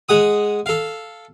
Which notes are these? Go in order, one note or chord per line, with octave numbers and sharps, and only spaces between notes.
G#3 F#5 D#6
A4 F5